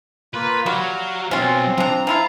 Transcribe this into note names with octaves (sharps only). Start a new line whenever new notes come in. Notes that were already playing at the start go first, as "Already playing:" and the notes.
A#3 F4 B4
F#3 G3 F#4 F5
B2 F#3 C4 C#4 F4
F3 D4 A#5
F3 E4 F4